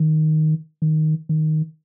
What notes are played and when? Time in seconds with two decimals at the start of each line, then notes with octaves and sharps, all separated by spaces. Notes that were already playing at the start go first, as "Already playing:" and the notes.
Already playing: D#3
0.82 D#3
1.29 D#3